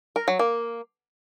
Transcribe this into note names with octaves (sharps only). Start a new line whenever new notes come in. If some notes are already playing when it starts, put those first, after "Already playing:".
A#4
F#3
A#3